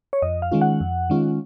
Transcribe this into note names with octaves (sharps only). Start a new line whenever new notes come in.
C#5
F2 D#5
F5
D#3 G#3 C#4 F4
F#5
F2
D#3 G#3 C#4 F4